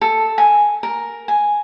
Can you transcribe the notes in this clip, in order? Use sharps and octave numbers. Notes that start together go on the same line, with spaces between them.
A4
G#5
A#4
G#5